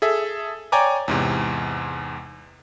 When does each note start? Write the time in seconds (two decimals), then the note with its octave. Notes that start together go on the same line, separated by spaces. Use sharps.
0.02 G#4 A4 E5
0.72 C#5 D5 G5 G#5 A#5 D6
1.08 E2 G#2 C3